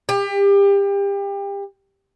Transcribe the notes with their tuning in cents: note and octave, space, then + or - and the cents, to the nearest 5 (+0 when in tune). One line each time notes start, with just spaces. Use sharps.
G4 +30